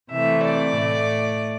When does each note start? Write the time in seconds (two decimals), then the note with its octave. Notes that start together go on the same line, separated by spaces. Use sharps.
0.11 C3 E3 A3 E5
0.43 D5
0.76 A2 A3